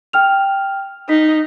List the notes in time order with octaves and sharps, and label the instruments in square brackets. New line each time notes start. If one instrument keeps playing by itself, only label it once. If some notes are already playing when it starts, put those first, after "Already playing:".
[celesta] G5 F6 F7
[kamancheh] D#4 [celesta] B6